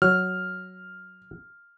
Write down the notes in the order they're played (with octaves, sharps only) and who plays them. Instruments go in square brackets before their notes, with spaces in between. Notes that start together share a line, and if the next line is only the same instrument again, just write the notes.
[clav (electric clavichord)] F#3 [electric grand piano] F6